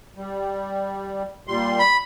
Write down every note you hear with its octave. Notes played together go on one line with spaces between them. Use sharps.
G3
A#2 G3 C6
B5